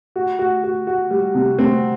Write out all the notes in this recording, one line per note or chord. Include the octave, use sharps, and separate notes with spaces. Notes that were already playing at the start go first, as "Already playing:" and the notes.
F#4
F#4
F#4
F#4
G3
C3
C4